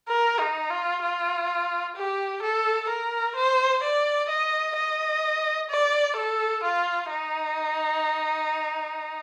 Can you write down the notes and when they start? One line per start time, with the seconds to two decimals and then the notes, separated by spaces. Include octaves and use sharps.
0.09 A#4
0.39 D#4
0.70 F4
1.02 F4
1.96 G4
2.42 A4
2.89 A#4
3.36 C5
3.83 D5
4.30 D#5
4.76 D#5
5.70 D5
6.16 A4
6.63 F4
7.10 D#4